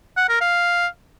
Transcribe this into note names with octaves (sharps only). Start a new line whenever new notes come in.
F#5
A#4
F5